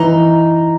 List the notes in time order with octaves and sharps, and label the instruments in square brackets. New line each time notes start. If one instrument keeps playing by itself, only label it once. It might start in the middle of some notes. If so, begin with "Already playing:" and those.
Already playing: [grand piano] E3 [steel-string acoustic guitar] D#4